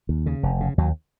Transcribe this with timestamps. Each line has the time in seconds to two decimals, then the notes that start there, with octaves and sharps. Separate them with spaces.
0.09 D#2
0.26 C#3
0.43 F1
0.60 C#3
0.78 D#2 F#3